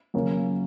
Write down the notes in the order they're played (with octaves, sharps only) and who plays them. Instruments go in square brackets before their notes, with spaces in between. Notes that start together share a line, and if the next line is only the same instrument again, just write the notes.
[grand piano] F#2 C#3 F3 A#3 C#4